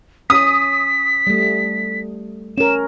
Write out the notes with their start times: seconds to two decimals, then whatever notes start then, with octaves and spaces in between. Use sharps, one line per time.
0.30 C#4 D#6 B6
1.27 G3 A3
2.58 C#4 A#4 E7